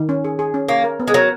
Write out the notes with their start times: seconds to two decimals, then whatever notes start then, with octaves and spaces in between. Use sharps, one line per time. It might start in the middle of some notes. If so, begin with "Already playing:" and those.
Already playing: D#3
0.09 C#4
0.25 G#4
0.39 G#4
0.54 C#4
0.69 A#3 C#5
0.84 A#4
1.00 B3
1.08 G#3
1.14 F#3 A#4